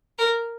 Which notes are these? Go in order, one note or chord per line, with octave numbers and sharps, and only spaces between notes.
A#4